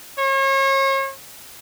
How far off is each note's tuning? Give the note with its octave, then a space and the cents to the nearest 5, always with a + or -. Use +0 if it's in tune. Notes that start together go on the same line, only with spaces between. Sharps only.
C#5 -40